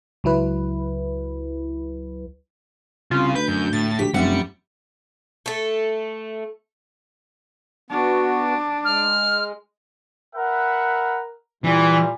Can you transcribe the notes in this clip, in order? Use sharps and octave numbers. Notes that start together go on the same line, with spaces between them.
C#2 F#3 E4 B4
C2 C#3 F4
D2 B4 G6
F#2
A2 A6
D2 G4 B6
F1 F#2 G3 E5 F#5 C#7
A3 A4
B3 D4 F#4
G#3 F6
A#4 B4 E5 F#5
A#2 E3 G3